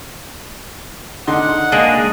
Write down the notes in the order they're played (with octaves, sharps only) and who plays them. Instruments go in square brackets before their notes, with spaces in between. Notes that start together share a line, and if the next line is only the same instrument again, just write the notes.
[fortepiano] D3 D#4 C6 [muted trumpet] F#5
[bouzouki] G#3 A#3 [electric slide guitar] D4 G#4